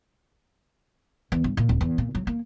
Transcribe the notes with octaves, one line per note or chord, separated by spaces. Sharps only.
E2
G2
A#2
D1
E2
A#2
F#3
A#3